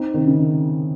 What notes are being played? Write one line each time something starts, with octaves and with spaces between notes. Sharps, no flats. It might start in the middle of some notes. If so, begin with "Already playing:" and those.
Already playing: C4 D#4
C3 D#3
C#3